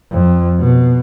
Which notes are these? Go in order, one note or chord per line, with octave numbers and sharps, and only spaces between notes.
F2
B2